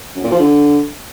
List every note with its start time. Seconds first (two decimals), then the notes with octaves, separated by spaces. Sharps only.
0.16 F#2
0.24 A#2
0.32 F3
0.40 D3